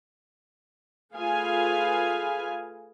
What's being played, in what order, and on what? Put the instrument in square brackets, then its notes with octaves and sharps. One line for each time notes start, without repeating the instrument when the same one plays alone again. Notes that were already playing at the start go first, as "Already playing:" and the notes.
[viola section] A3 F4 G#4 B4 F5 G#5